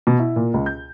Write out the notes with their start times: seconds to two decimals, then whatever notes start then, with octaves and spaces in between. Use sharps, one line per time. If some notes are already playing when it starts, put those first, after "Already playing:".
0.07 B2
0.19 E4
0.36 A#2
0.54 C#2
0.66 G6